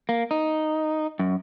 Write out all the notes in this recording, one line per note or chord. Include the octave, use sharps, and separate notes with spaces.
A#3
D#4
F#2